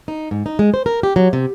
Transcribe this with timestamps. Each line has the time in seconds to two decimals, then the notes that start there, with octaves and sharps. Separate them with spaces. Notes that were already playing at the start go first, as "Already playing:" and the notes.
0.08 D#4
0.31 G#2
0.46 D#4
0.59 G#3
0.74 C5
0.86 A#4
1.03 G4
1.16 F#3
1.33 C3